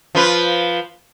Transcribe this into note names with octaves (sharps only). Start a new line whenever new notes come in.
F3 F4 B4